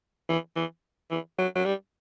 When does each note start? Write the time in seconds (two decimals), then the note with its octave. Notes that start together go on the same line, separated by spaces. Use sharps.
0.29 E3
0.56 E3
1.11 E3
1.39 F#3
1.55 F#3
1.65 G3